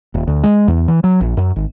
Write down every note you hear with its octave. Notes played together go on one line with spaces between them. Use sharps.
D#1
D2
G#3
E2
E3
F#3
A#1
F#2
G#1